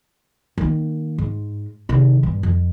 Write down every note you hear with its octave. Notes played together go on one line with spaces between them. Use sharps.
D#3 A#3
G#2
C3 D#3
G2 A#2
F2